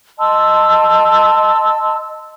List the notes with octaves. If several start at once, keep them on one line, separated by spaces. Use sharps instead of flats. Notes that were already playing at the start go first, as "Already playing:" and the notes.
D#5 A5 C6 E6